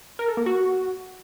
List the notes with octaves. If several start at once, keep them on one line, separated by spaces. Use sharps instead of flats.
A#4
A4
A#3
F#4